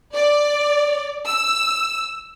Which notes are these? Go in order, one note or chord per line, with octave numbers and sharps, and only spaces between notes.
D5
E6